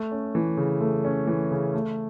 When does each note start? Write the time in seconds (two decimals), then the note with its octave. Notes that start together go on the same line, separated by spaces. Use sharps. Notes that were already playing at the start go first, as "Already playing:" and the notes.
Already playing: A3
0.12 C#4
0.35 E3
0.57 C#3
0.81 A3
1.05 C#4
1.27 E3
1.51 C#3
1.74 A3